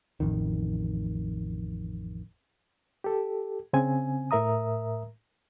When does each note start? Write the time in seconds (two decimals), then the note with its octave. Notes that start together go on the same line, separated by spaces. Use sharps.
0.20 A1 F2 D#3
3.04 G4 A4
3.73 C#3 C4 G#5
4.31 A2 A#4 E5 A#5 D#6